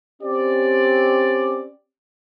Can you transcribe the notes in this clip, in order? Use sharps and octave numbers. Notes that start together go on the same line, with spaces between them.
C4 C#4 G4 D5